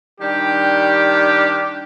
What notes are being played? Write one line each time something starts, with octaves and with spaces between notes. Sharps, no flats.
D#3 G3 D4 G4